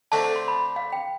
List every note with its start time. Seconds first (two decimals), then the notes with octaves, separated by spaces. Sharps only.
0.12 D3 A3 C4 A5
0.24 A5
0.36 C6
0.48 B5
0.76 F5
0.92 G5